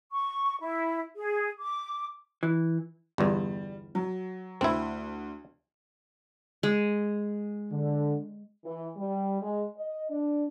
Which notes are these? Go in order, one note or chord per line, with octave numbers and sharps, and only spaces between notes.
C#6
E4
G#4
D6
E3
G1 E2 G3
F#3
D2 C4 E4
G#3
D3
E3
G3
G#3
D#5
D4